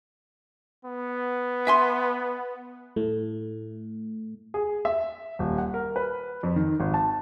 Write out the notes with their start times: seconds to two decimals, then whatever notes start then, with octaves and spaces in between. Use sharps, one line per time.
0.85 B3
1.67 E5 G#5 C6
2.96 A2 A3
4.54 G#4
4.85 E5
5.39 D#1
5.58 F#5
5.74 A#4
5.96 B4
6.43 F2
6.56 D#3
6.80 G#1
6.94 A5